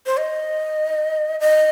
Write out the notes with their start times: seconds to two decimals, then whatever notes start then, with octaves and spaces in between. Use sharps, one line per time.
0.06 C5
0.17 D#5
1.40 D#5